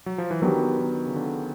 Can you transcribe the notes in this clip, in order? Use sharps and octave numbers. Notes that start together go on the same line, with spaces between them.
F#3
F3
E3
D#3 F#3 B3 D4 G4
D#3
C#3
D3